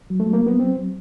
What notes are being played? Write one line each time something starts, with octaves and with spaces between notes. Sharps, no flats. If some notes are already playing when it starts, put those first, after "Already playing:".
F#3
A3
F#3
A#3
F#3 B3
F#3 C4
F#3